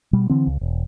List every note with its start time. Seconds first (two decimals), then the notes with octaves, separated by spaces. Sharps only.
0.13 B2 G3
0.30 D3 E3 C4
0.47 C#2
0.61 E1